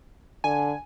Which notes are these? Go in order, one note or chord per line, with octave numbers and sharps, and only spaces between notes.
D3 G#5